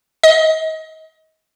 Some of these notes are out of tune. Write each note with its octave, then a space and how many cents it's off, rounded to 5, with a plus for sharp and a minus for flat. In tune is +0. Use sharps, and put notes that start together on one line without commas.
D#5 +30